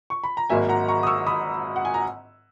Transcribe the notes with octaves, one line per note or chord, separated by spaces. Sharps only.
C#6
B5
A#5
G#1 G#2 F#3 A#3 E5 G#5
F#5 A#5
A#5 C#6
D#6
C#6 E6
B5 D#6
F#5
G#5
A#5